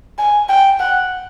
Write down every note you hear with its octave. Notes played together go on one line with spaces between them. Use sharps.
G#5
G5
F#5